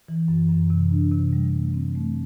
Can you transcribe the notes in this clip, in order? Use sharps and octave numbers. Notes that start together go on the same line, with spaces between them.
E3
F#2
F#2
C3
D4
C3
G3
A3
C4
A3